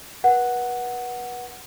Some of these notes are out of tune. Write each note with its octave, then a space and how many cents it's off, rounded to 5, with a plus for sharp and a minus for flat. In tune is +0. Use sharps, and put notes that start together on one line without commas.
B4 -35 F#5 +0